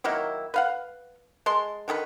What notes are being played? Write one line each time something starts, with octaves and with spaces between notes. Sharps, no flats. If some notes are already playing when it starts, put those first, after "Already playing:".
D#3 F#3 A#3 E4
B4 F5 F#5
G#3 A5 C6
D3 D#3 G#4 B4